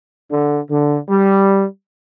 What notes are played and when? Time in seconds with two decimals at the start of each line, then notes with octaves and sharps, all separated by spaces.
0.31 D3
0.70 D3
1.09 G3